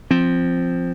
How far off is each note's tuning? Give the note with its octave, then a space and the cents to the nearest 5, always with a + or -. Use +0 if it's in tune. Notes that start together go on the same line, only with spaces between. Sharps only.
F3 +0 C4 +0